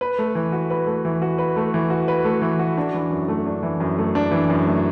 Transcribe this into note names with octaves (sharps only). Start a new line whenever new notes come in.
B4
A3
E3
F#4
B4
A3
E3
F#4
B4
A3
E3
F#4
B4
A3
E3
F#4
D4
E3
F#2
A3
D4
E3
F#2
A3
D4
E3
F#2
A3